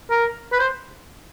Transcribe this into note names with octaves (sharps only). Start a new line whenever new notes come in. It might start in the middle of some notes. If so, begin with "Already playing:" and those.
A#4
B4
C5